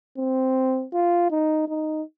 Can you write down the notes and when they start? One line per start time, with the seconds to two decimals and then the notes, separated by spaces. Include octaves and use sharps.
0.18 C4
0.93 F4
1.31 D#4
1.68 D#4